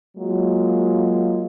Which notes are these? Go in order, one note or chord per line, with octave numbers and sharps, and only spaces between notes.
F#3 G#3 A#3 F4